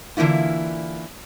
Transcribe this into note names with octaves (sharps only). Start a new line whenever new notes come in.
D3 E3 A#3 E4 F4